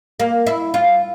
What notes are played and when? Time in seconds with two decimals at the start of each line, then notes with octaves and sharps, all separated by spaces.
0.20 A#3
0.47 E4
0.74 F4